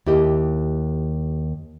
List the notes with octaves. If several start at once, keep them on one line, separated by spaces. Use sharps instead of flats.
D#2 E4 G4 D#5